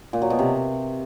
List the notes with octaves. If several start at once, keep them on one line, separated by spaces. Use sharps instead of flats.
A#2
F#3
B2
C3